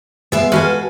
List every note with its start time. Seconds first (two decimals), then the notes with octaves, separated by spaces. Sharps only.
0.32 G#3 B3 E5 F5
0.52 G#3 F#4 A4 B4 F5 G#5